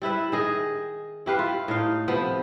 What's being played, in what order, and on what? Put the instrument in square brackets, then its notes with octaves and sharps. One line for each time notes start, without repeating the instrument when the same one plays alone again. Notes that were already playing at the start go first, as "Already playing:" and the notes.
[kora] G3 E4 B4 E5
D#3 G#4 D#5
E4 G4 B4 F5
F4
A2 D#4 F5
C3 F3 B3